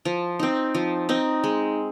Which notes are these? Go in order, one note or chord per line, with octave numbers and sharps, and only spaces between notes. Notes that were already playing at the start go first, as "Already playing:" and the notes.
F3
C4 D#4
F3
C4 D#4
G#3